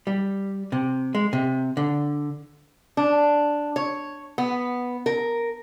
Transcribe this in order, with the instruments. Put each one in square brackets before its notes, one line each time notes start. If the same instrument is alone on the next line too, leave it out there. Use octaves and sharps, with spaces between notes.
[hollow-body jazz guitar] G3
C3
G#3
C3
D3
[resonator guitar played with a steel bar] D4
C#5
B3
A#4